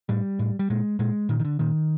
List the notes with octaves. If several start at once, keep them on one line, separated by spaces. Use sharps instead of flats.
A2 G3
A2
G3
A#2 G#3
A#2 G#3
A#2 D#3
D#3
D3
A#2 D#3